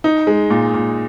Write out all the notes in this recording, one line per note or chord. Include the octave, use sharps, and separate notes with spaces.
D#4
G#3
A#2
A#2